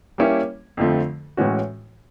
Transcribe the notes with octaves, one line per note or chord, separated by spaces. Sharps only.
G3 A#3 C#4 E4
F2 D3 F3 A3 C4
A2 E3 G#3 C#4 F#4